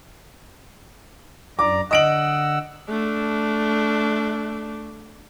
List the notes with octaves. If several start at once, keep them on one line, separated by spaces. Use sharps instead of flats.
F#2 D5 A#5 D6
D3 D#5 F#5 E6 D7 F#7
A3 D4